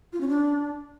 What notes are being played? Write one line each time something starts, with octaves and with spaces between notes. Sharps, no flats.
F4
C#4
D4